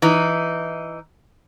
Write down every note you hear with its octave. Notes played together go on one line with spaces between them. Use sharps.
E3 D#4